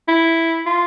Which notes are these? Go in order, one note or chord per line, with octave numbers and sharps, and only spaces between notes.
E4
F4